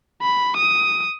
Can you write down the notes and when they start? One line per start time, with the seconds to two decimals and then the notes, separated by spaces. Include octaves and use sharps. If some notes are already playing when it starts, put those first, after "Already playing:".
0.22 B5
0.57 D#6